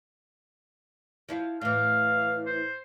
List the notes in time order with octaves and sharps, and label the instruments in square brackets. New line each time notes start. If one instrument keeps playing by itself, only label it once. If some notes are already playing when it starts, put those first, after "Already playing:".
[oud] F3 E4 F4
[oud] A2 E3 [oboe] F5
[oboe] C5